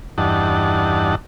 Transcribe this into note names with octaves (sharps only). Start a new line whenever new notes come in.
E2 G2 D4 D#4 F#5 A5